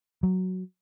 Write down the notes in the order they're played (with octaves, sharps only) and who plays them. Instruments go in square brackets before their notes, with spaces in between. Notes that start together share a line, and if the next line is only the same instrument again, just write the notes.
[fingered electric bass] F#3